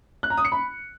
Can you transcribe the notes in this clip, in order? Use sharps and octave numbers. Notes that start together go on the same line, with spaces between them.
F#6
A#5
D#6
C#7
B5